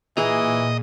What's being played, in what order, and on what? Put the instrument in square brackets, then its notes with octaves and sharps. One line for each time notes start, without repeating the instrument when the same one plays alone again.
[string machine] A#2 [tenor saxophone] E3 [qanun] G#4 A#5 [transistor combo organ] D#5